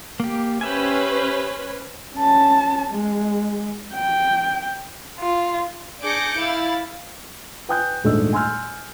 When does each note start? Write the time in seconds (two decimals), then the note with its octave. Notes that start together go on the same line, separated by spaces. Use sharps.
0.20 A#3 G4
0.61 C#4 G4 B4 C5 E5 G#5
2.15 C#4 A5
2.90 G#3
3.94 G5
5.20 F4
6.02 D4 G#4 D6 G6 A#6 C#7
6.38 E4 F5 A6
7.69 B4 G5 G#5 D#6 F#6 G6
8.04 D#1 G#2 A3 D4 D#5 E6
8.33 G#5 C6 E6 F6 G6